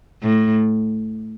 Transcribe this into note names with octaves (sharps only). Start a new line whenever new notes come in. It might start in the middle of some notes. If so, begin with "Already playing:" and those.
A2